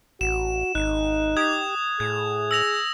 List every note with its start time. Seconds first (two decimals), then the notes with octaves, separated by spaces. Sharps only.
0.21 A1 F#4 E7
0.75 G#1 D#4 F#6
1.37 G4 D#6 G#6
2.00 A2 G#4 G#6
2.51 E6 A#6 F7